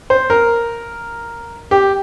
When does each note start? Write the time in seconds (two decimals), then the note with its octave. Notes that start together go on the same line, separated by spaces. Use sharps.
0.10 C5
0.30 A#4
1.71 G4